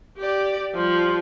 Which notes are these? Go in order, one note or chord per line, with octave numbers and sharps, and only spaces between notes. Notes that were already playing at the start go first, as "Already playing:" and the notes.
G4 D5
F3 G3